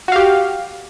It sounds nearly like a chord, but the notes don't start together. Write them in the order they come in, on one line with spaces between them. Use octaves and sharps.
F#4 F5 G4